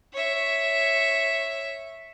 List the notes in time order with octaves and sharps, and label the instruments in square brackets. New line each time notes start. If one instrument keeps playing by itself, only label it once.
[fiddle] C#5 E5